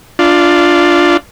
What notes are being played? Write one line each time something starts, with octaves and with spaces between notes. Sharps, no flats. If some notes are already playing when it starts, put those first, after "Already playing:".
D4 F4